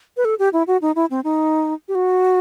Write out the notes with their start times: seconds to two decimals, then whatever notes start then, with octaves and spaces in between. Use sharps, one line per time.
0.17 B4
0.25 A4
0.39 G4
0.53 E4
0.67 F#4
0.82 D#4
0.96 E4
1.11 C4
1.24 D#4
1.88 G4
1.95 F#4